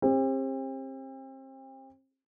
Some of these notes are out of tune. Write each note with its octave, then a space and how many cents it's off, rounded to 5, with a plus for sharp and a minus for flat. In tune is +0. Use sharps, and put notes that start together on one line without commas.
C4 +35 G4 +40